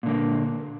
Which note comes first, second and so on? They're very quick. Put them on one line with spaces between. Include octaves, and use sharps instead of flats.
A#2 D3 A#3